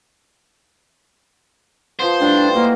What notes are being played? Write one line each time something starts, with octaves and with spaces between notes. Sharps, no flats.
F3 B3 C5
A2 G3 D4
A#3 F#4 B4 D#5